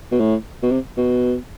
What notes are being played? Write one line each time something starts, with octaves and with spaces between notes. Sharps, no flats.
B2
A2
B2
C3
B2